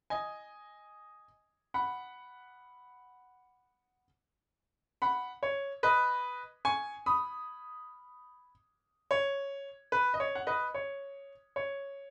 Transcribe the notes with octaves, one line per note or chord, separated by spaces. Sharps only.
D#5 G#5
F#5 B5
F#5 B5
C#5
B4 D#5
G#5 C#6
B5 D#6
C#5
B4
D#5
C#5
F#5
B4 D#5
C#5
C#5